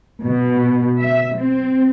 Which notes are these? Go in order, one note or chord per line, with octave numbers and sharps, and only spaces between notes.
B2
E5
C4